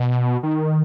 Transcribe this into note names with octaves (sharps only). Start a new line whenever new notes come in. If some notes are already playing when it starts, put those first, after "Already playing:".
Already playing: B2
D#3